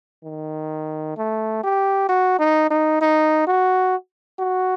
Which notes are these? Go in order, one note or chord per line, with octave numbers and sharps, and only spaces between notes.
D#3
A3
G4
F#4
D#4
D#4
D#4
F#4
F#4